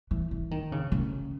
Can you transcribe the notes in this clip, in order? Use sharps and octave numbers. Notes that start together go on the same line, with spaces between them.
E3
E3
D#3
C#3
C#3